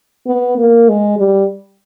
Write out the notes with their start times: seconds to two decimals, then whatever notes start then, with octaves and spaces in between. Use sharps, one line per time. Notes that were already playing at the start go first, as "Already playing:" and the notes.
0.27 B3
0.58 A#3
0.89 G#3
1.18 G3